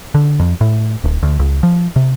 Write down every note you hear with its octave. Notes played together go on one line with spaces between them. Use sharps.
D3
F2
A2
D1
D2
C#2
F3
C3